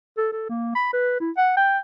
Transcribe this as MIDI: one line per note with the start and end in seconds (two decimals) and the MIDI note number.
0.17 0.30 69
0.32 0.47 69
0.49 0.72 58
0.75 0.89 83
0.93 1.16 71
1.20 1.30 64
1.37 1.54 78
1.57 1.78 79